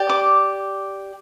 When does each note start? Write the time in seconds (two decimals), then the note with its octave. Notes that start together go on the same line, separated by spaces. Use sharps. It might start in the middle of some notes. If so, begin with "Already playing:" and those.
Already playing: G4 D5
0.09 D6